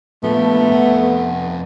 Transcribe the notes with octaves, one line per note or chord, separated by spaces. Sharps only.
A#2 F3 A3 B3
F2 F#5